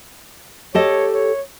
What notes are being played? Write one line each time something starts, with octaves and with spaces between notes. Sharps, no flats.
G4 A4 C#5 D#5
C#5